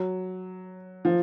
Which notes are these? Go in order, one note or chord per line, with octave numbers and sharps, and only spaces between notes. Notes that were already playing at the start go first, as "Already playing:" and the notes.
Already playing: F#3
F3